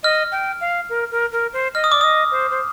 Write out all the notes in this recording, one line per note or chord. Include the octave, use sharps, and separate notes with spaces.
D#5 F6
G5
F5
A#4
A#4
A#4
C5
D#5 F6
D#6
D5 D6
D#5 D#6
C5
C5